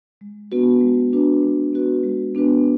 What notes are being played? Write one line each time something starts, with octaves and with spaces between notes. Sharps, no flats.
G#3
B3 D4 F#4 B4
G#3
B3 D4 F#4 B4
G#3
B3 D4 F#4 B4
G#3
B3 D4 F#4 B4